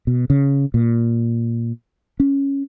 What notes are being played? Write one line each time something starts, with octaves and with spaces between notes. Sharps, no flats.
B2
C#3
A#2
C#4